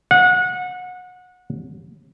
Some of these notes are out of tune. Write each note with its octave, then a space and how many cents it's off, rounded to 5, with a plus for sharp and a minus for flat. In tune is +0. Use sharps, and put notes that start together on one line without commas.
F#5 -25